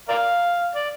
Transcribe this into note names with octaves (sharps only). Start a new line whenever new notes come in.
A#4 D5 F5
D5